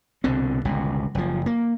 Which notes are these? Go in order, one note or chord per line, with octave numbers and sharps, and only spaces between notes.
C2 B2 D3 C4
G1 C#2 B2
F#1 F3
A#3